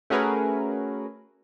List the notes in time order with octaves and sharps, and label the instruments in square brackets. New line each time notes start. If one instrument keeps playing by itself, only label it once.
[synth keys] A3 C#4 F#4 G#4 A#4 B4